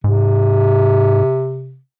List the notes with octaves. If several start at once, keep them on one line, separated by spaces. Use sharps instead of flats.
G#2 C3